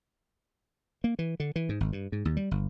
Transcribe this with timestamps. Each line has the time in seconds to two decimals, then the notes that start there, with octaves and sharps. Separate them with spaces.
1.04 A#3
1.19 E3
1.40 D3
1.56 E3
1.69 G#2
1.80 G#1
1.92 G2
2.12 G#2
2.25 D#2
2.37 G3
2.51 G1